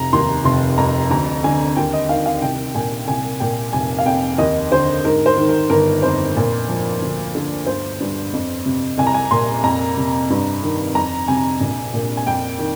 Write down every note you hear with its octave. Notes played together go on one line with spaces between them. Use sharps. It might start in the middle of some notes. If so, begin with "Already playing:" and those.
Already playing: F1 A#5
D#2 C6
F1 C6
F2 A#5
D2 A#5
D3 G#5
D#2 G5
D#5
D#3 F5
F5
C2 G5
A#2 G#5
C2 G#5
A#2 G5
F1 G#5
F5
F2 G5
D#2 D#5
D3 C5
G#2 A#4
C5
D#3
A#4
G1 A#4
F2 C5
A#2
F3
D2
D3
G1 C5
G2
F2
C3
C2 G#5
A#5
G#5
A#2 C6
F2 A#5
C3
G2
D#3
F2 A#5
C3 G#5
A#1
A#2
G#5
F2 G5
D#3